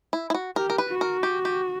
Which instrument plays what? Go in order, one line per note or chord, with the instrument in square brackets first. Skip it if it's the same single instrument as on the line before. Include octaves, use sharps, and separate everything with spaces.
[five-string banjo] E4
E4
F#4
[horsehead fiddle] G4 [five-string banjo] A#4
[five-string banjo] A#4
B4
[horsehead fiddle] F#4
[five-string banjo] A#4
G4
G4